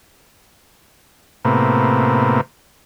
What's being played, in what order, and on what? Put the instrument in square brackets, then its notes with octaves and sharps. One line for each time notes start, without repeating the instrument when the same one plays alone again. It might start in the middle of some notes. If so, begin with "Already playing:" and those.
[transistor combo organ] A2 C3 A#3 B3